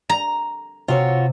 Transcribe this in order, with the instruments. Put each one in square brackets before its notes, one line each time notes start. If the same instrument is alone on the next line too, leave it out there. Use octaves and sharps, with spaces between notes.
[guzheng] A#5
[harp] C3 [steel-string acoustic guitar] F4 F#4 C#5